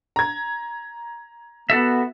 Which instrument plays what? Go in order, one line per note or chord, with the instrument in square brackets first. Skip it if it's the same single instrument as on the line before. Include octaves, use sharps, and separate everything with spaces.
[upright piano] A#5 G#6
[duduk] B3 [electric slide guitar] F#4 A4 E5